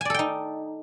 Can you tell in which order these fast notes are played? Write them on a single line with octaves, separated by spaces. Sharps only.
G#5 D5 A4 G5 D#4